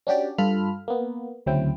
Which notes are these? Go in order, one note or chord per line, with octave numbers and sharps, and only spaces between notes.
C#4 D4 F#4 G4 D5
G2 F4 A4 B5 F6
A#3 B3
D2 C#3 F#3 C4 E4 G5